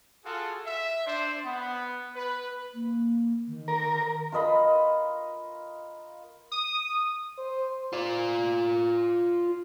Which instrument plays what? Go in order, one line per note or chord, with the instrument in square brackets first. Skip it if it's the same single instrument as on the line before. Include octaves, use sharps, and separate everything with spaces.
[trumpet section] F4 F#4 G#4 A4
E5
D4 C5
B3
B4
[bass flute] A#3
D#3
[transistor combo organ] A#4
[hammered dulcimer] F4 A#4 D#5 B5
[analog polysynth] D#6
[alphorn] C5
[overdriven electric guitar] F4 D5